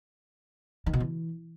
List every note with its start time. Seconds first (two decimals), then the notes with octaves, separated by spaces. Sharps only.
0.86 D#3
0.93 B2
1.00 E3